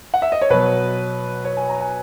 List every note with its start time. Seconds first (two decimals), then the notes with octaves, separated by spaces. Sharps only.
0.14 F#5
0.22 E5
0.32 D#5
0.41 C#5
0.50 B2 F#3 B4
1.45 C#5
1.57 G#5
1.69 A#5
1.80 G#5